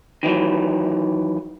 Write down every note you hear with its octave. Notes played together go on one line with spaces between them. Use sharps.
D#3 E3 F#3